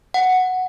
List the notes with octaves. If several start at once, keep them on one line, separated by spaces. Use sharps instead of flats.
F#5